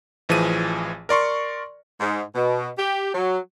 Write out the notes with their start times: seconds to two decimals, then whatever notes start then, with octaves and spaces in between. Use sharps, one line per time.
0.29 A1 E3 F3 G#4 D#7
1.09 A#4 D5 C6 C#6
1.99 G#2
2.35 B2
2.77 G4
3.13 F#3